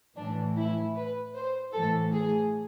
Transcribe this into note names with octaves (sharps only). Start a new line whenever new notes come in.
A2 E3 D4
E4
B4
C5
A2 E3 A4
G#4